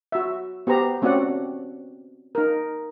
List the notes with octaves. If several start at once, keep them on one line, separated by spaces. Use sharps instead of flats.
F#4 E5
B3 G4 C5 A#5
A3 C4 C#4 F#4 D5 F#5
D#4 A#4